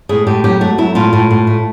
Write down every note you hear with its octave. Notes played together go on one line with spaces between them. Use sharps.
A2 G#4
A2 G4
F#3 G4
A3 F#4
F#3 E4
A2 F4
A2
A2
A3